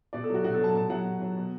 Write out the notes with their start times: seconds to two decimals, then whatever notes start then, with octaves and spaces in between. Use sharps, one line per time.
0.13 B2 D5
0.24 A4
0.29 F#3 F#4
0.44 B2 F#4
0.54 A4
0.60 F#3 A5
0.74 B2 A5
0.90 F#3 F#5
1.05 B2
1.22 F#3
1.37 B2